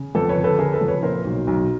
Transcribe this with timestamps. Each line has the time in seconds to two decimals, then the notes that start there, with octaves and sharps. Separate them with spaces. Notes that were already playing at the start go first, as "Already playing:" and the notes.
Already playing: C#3
0.15 F2 A4 B4
0.29 B4 C#5
0.37 G1
0.44 A4 B4
0.59 C#3 G#4 A#4
0.73 A4 B4
0.81 F2
0.88 B4 C#5
1.03 A#2 A#4 C5
1.25 B1
1.47 B1